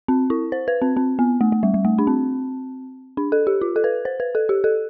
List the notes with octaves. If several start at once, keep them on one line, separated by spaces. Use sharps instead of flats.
C4
E4
C5
B4
C4
C4
B3
A3
A3
G3
G3
A3
D4
C4
D4
A4
G4
F4
A4
B4
C5
B4
A4
G4
A4